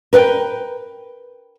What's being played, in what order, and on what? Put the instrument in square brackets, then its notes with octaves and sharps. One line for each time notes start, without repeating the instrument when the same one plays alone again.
[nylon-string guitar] A#4 B4 F#5 G5